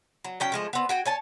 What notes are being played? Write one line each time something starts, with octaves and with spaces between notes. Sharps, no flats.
F#3
F#3 C#4 G5
F3 G#3 A3
B3 C4
F#4 G5 G#5
C#5 G#5 A5